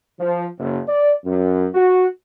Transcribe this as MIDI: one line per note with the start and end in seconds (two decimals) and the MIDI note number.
0.20 0.43 53
0.58 0.79 30
0.88 1.13 74
1.24 1.67 42
1.74 2.06 66